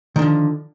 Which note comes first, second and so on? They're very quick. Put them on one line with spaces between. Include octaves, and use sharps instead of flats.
D#3 D3 F3